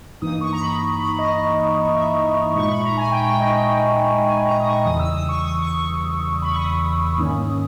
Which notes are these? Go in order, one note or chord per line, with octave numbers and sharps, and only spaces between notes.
G2 E3 A#3 D#4 D#6
C#6
A#5
B5
B5
D#5
E5
A#2 G#3 D#4 C#6
B5
A#5
G#5
G5
G5
D#5
G5
G#5
A#5
D#6
C#6
E2 C#3 E3 G3 D#6
E6
D#6
C#6
D#6
C#6
B5
C#6
D#6
G#2 D#3 A#3 C#4